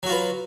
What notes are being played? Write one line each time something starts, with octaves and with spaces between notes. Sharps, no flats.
F#3 F4 F#4 B4